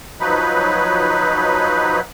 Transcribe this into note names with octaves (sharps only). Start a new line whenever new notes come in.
F3 F#3 D#4 B4